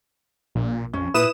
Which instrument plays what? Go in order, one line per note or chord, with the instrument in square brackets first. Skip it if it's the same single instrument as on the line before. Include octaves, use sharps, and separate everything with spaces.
[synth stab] A#1 [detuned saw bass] A#2
[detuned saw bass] F2 [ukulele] C#4
[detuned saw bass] A#2 [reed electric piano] E4 [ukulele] B4 [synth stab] D#6 E7